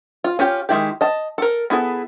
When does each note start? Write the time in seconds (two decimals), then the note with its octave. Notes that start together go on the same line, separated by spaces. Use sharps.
0.24 F4
0.39 C#4 F4 G4
0.69 D#3 G#3 E4 G4
1.01 D#5 A5
1.38 A4 A#4
1.70 B3 E4 G#4 A4